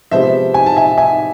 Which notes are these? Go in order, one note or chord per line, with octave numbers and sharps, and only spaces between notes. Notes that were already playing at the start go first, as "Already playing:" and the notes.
C3 F3 G#3 B3 C5 E5
G#5
A5
E5 G#5
E5 G#5